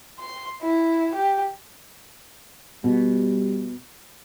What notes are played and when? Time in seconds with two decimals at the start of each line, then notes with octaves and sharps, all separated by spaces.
0.19 C6
0.62 E4
1.15 G4
2.84 B2 G3